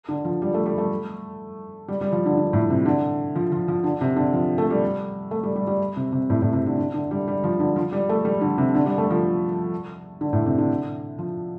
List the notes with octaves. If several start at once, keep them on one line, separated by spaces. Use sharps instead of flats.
D3
F3
G3
A3
G3
A3
G3
G3
F3
D3
D3
A2
C3
D3
F3
F3
F3
D3
C3
D3
F3
A3
G3
A3
G3
G3
G3
C3
C3
A2
A2
C3
D3
D3
D3
G3
G3
F3
D3
F3
G3
A3
G3
D3
C3
D3
G3
A3
F3
D3
A2
C3
D3
F3